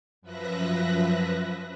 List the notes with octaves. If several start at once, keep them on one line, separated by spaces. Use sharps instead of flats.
F#2 F3 B4 E5 F#6 A#6